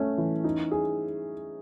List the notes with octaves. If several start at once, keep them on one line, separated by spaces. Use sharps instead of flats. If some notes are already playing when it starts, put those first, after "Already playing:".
Already playing: A3 C#4
E3
D#4
G#4